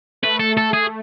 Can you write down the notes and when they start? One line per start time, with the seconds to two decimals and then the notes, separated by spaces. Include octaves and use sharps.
0.22 A3 B4
0.40 A4
0.57 A4
0.73 G#4